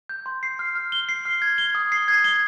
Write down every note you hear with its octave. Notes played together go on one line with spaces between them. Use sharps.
G6
C6
C7
F6
F6
G7
C7
F6
G#6
G7
D#6
C7
G#6
G7